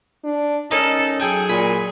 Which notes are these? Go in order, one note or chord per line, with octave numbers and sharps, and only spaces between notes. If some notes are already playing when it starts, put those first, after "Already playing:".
D4
C#4 D#4 A4 A#4 D#5
F#3 G#4 A4 G5 G#5
A#2 G#5 B5 B6